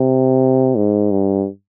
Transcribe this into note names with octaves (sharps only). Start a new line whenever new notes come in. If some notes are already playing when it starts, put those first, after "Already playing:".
Already playing: C3
G#2
G2